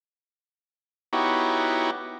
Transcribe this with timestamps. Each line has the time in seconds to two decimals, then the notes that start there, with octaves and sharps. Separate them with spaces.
1.13 B3 D#4 E4 F#4 G4 C#5